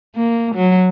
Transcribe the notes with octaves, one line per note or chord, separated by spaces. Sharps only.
A#3
F#3